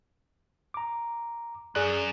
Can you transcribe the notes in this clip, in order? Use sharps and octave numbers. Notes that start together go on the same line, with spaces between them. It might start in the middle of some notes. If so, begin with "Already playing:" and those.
A#5 D6
F#2 G#4 D5 F#6